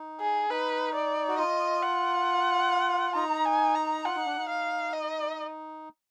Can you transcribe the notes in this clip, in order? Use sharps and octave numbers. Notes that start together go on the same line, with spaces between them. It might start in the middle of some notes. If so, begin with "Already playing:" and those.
Already playing: D#4
G#4
D#4 B4
D5
F#4
F4 D#5
F#5
D#4 A#5
G#5
A#5
F4 F#5
D#4
D4
D#4
F5
D#5